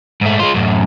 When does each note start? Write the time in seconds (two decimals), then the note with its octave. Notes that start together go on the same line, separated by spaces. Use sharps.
0.21 G#2 A3
0.39 G#3 F4
0.54 F#2 A2